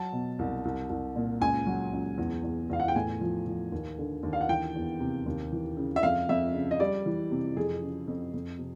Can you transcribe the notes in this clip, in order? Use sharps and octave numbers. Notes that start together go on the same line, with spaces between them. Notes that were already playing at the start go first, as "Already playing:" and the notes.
Already playing: F#3 A5
B2
C2
C2
C2
A#2
C#2 G#5
F#3
C#2
E2
E2
E2 F5
F#5
G5
A2 G#5
F3
F3
D#2
D3
D#2
F5
F#5
E3 G5
E2
C3
D#2
E3
C#3
E5
F2 F5
F2 E5
C#3
D#5
G3 D5
E3
C3
F2 G#4
C#3
F2
F2
C3